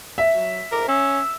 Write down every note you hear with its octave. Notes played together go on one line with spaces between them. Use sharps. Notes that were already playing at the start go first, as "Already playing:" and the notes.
E5
F#3
F2 G#2 A#4 D6
C#4 E6